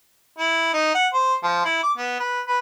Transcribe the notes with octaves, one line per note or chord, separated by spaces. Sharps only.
E4
D#4
F#5
C5
F3
E4
D6
B3
B4
B4